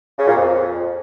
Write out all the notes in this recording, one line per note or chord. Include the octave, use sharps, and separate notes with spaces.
C#3
A#2
F2